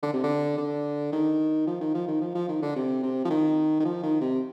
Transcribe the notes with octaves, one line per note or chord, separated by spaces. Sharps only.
D3
C3
D3
D3
D#3
F3
D#3
F3
D#3
F3
F3
D#3
D3
C3
C3
F3
D#3
D#3
F3
D#3
C3